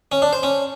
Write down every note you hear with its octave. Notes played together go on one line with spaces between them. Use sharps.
C#4
D4
C5
C#4